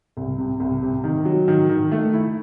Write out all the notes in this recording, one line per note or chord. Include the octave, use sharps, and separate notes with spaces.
C2
C3
C2
C3
D#3
F#3
D#3
D#3
A3
E4